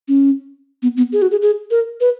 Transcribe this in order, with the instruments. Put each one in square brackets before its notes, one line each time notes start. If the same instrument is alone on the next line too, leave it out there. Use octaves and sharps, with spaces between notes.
[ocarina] C#4
B3
B3
G#4
F#4
G#4
G#4
A#4
B4